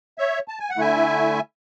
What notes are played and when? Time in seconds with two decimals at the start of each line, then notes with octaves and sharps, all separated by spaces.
0.18 C#5 E5
0.48 A5
0.59 G#5
0.70 F#5
0.77 D3 A3 E4 E5 G#5